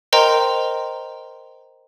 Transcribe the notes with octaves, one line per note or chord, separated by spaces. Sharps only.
A#4 C5 D#5 G5 A#5 C6